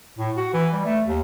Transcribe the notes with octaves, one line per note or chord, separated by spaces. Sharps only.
A2
F#4
E3
G3
A3
D#2